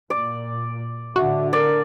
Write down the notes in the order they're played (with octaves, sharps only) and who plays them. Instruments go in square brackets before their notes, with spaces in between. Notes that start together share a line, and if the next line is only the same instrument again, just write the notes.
[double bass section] A#2 [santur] D5
[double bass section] A2 D3 [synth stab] F#4 [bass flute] E5
[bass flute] A#4 [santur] D5